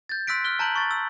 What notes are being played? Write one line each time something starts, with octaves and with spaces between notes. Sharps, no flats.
G6 A6
C6 E6 F#6 B6 D7
F6 F#6 G7
A5 A#5 G6 D7 F#7
C#6 A6
E6